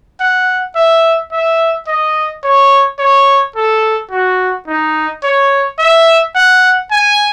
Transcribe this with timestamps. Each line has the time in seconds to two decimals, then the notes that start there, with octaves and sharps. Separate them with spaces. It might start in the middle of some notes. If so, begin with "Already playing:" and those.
0.20 F#5
0.75 E5
1.32 E5
1.87 D#5
2.44 C#5
2.99 C#5
3.56 A4
4.11 F#4
4.68 D#4
5.23 C#5
5.79 E5
6.35 F#5
6.91 G#5